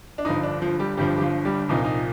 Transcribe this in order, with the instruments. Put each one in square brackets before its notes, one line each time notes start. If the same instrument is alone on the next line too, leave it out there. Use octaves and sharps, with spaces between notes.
[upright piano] D4
G1 G2 F3 D#4
D4
F3 F4
G3 G4
G1 G2 F3 G3 G4
G4
F3 F4
G3 G4
C2 A#2 F3 D#4
F4
D#4